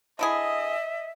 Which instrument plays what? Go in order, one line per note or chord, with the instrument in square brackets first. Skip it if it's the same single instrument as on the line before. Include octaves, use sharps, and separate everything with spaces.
[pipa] D3 E4 G#4 [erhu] D#5 [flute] E5